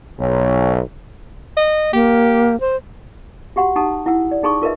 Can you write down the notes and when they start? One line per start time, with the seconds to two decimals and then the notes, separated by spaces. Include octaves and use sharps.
0.20 B1 C#5
1.57 D#5
1.93 A#3 G4
2.60 C5
3.56 F#4 G4 F#5 C6
3.76 D#4 G4 F#5 A5 A#5 D#6
4.06 E4 F#5 E6
4.31 D5
4.43 D#4 G#4 A5 C6 C#6 D#6
4.62 F4 A#4 B4 D#5 E5